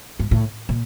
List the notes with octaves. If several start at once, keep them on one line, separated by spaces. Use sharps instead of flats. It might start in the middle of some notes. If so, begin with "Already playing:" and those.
G#2
A2
A#2